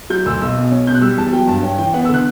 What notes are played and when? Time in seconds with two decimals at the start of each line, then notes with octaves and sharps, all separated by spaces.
0.10 F#3 G6
0.26 D2 E6
0.41 B1 E6
0.57 B2
0.71 C#4
0.87 B2 G6
0.94 F#6
1.01 G3 E6
1.17 E2 A5
1.33 F#3 G5
1.47 G2 A5
1.63 C#4 G5
1.78 E3 G5
1.94 B3 F#5
2.05 E6
2.09 D3 F#6